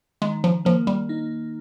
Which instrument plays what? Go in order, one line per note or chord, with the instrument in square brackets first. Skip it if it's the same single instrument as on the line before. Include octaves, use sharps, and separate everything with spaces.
[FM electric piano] D#3 [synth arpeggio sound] G#3
[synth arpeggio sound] F3
[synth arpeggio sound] F3 [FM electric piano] A#3
[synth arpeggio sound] G3
[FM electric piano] D#4